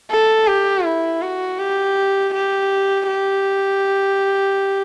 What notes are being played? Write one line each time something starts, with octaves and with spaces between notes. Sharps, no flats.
A4
G4
E4
F#4
G4
G4
G4